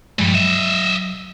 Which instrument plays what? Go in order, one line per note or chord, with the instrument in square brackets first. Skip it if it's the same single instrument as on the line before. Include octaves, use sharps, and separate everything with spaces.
[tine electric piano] G2 F3 G#3 [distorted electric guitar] A#2 G3
[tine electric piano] F#3 [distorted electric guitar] D#5 E5